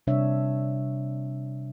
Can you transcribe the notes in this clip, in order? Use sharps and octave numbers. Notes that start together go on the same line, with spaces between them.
C3 G3 D4 C#5 E5